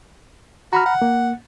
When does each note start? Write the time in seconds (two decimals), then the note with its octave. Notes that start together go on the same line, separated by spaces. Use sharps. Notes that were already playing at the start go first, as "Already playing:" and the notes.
0.73 F#4 A#5 B5 F6
0.86 F#5
1.02 A#3